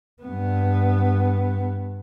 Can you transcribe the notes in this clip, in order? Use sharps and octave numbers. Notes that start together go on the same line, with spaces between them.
G2 B3